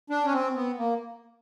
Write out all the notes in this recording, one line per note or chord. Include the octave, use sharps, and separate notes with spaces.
D4
C#4
C4
B3
A#3